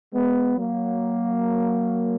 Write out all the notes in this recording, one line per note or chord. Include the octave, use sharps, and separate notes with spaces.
G#3 B3
F#3 A#3